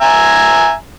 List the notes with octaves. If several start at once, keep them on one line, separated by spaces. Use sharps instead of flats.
E5 G#5 A#5